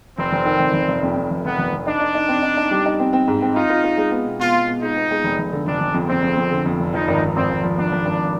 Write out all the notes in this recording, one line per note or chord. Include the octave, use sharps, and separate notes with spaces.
F1 C4
F1
D#3
F1
F1
F1
F2
F2
F1
F1 B3
F1
F1
D4 D#4
D#4
D#4
C4
D#4
D#4
G3
D#4
C4
C4
G#2
C4
D#4 F4
F4
F4
G#3
B3
B2
B2 F4
B2
B2
G#3 D#4
B3
G#3
F1
F1
D3
F1 D4
F1
F2
F2 C4
F2
F2
D3
F2
F1
F3 D#4
G#1
G#1
G#1 C4
G#1
F3
F3 D4
F3
G#1